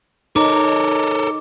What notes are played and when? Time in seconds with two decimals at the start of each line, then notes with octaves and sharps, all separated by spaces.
0.36 D#4 A4 A#4 C#5 D6